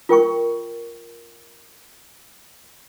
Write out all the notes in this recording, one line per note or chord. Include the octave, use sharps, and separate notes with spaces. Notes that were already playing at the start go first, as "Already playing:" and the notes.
F4 A#4 G5 C#6